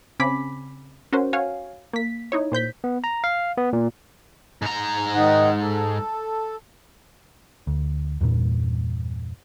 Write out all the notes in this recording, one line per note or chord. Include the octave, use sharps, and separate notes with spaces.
C#3 C4 G#5 B5 D6 B6
C#4 F#4 A#4 C5
F#4 C#5 F5 G#5
A#3 B6
D#4 E4 C#5
A#2 C5 G6 B6
B3
A#5
F5
B3
A#2
G#2 A#5
D#3 D#4 F#5
A4
D2
E2 G2 A#2